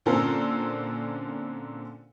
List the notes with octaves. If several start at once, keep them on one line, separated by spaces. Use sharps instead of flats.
A#2 D3 C4 C#4 A4 A#4